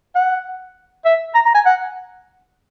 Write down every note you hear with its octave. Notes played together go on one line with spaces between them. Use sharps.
F#5
E5
A#5
A#5
G#5
F#5